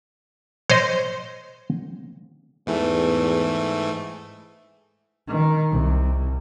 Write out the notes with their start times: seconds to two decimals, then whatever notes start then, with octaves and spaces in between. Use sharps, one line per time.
0.70 C5 C#5 D#5
2.67 E2 G#2 E3 A3
5.27 D#3
5.71 C2